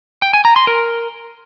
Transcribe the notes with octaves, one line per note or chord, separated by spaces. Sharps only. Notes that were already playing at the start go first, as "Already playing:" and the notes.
G5
G#5
A#5
C6
A#4